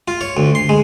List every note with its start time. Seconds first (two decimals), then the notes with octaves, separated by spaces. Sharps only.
0.08 F4
0.21 C#5
0.37 D2
0.55 C6
0.69 G#3